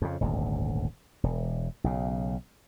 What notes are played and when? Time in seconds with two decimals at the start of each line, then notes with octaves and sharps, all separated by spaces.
0.02 F2 C#3
0.21 D#1 G#1 D2
1.23 E1
1.84 B1 C#3